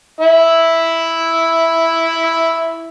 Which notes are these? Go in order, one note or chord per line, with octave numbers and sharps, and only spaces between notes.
E4 E5